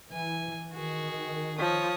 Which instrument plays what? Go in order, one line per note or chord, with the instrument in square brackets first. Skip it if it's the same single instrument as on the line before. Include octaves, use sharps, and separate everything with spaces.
[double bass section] E3 [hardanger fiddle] G#5
[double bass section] D#3 [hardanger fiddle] F#4 G#4
[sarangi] F3 [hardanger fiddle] C#5 D#6